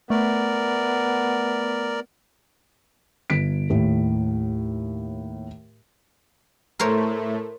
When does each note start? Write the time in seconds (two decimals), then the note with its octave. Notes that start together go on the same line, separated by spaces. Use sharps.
0.10 A3 B3 A#4 D5
3.30 G1 B6 D7
3.70 D#2 A2
6.79 A2 A3 A#4 C5 C#5